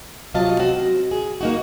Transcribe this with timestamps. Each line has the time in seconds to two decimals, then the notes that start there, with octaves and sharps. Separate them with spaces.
0.34 C3 F#3 F4 D#5 F5 A5
0.60 C4 F#4
1.11 G#4
1.41 A#3 D#4 F#4